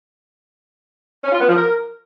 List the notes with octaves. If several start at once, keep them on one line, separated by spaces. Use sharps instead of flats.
C#4
F4
B3
F3
A#4